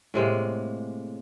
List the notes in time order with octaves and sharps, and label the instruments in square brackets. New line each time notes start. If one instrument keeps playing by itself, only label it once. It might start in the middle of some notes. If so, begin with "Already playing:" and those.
[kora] A2 C3 G#3 A#3